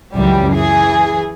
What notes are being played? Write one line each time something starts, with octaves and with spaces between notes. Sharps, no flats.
C#2 F#2 E3 G3
E3 G#4